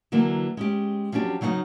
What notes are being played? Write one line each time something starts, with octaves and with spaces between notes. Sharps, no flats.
D3 E3 F#3 A#3
G#3 C#4 G4
F3 F#3 C#4 D4 G4
C#3 F#3 D#4 F5 F#5